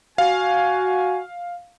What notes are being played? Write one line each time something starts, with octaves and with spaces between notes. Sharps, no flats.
F#4 F5 G#5